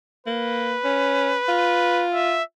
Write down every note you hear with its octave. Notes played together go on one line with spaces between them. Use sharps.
A#3 B4
C#4
F4
E5